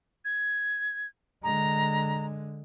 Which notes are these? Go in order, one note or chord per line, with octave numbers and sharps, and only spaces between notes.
G#6
D3 G#3 A#5